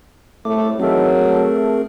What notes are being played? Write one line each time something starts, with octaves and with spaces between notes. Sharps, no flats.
C2 A2 A3 D6
D#3 E3 F#3 A3 C4 G#4 A#4
A3